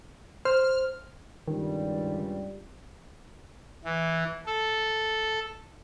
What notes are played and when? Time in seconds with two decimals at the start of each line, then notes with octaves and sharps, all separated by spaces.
0.45 C5 F6
1.48 C#2 G2 D#3 G3
3.85 E3
4.46 A4